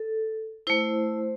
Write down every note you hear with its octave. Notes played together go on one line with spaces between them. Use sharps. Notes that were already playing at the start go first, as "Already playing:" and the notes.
Already playing: A4
A3 E4 C5